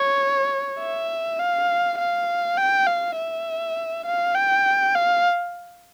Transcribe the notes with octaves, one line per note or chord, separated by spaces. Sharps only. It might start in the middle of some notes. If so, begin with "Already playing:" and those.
Already playing: C#5
E5
F5
F5
G5
F5
E5
F5
G5
F5